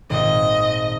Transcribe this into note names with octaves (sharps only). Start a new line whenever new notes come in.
G#1 A#2 D#5